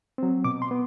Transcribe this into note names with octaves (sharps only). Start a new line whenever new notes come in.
F#3 C4
B2 D6
C6
B3